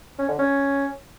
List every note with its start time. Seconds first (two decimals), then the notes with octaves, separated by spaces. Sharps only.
0.18 C#4
0.28 D3
0.38 C#4